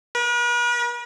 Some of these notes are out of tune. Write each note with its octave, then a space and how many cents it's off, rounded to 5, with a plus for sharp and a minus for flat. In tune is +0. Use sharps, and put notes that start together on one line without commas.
B4 -45